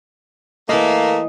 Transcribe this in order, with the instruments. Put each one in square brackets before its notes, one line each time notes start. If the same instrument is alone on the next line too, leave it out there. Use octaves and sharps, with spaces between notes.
[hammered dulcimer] E3 D#5 [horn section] A3 A#3